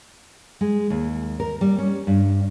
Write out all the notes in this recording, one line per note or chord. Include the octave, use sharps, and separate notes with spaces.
G#3
D#2
A#4
G3
C#4
G2